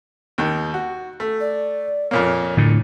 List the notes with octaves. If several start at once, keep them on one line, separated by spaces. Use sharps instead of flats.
D#2 D#3
F#4
A3
D5
F2 A#2 A#3 C#5
A2 D3